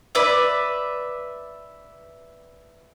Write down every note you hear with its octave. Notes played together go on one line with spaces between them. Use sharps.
B4 D5 E5